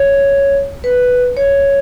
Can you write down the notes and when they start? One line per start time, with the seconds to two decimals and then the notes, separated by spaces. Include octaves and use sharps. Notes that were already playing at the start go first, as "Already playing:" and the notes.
Already playing: C#5
0.84 B4
1.37 C#5